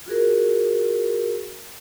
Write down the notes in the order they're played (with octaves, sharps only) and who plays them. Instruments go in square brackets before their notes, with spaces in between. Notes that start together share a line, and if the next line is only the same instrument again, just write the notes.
[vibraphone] F4 F#4 G#4 A#4